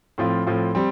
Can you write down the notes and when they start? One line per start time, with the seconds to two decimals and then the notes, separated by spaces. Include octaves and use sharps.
0.18 A2 F3 C4 F4
0.47 A2 F3 C4 F4
0.75 G3 C4